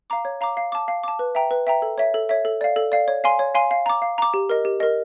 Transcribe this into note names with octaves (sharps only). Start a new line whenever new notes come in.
F5 A#5 D6
C#5
F5 A#5 D6
F5
A5 D6
F5
A5 D6
B4
E5 G5 A#5
B4
E5 G5 A#5
A4
C#5 E5
A4
C#5 E5
A4
D5 F5
A4
D5 F5
C#5
F5 G#5 C6
C#5
F5 G#5 C6
F5
A#5 D6
F5
A#5 D6
G4
A#4 D#5
G4
A#4 D#5